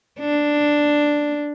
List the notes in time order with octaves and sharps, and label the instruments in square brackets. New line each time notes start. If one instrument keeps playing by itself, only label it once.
[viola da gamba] D4